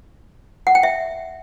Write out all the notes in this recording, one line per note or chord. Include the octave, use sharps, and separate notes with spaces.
F#5
G5
E5